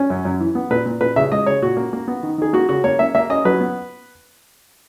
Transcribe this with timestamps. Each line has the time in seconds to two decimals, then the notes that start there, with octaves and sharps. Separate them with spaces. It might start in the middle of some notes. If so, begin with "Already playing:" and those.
Already playing: C#4
0.10 F#2
0.25 F#2
0.40 E3
0.55 B3
0.70 A#2 B4
0.86 A#2
1.01 A#2 B4
1.16 C#3 E5
1.32 G#3 D#5
1.46 C#3 C#5
1.62 A#2 F#4
1.77 A#3
1.93 A#3
2.08 B3
2.23 D#3
2.38 D#3 G#4
2.53 A#3 F#4
2.69 C#3 F#4
2.84 A#3 C#5
2.99 A#3 E5
3.15 A#3 E5
3.29 C#4 D#5
3.45 F#3 B4
3.60 B3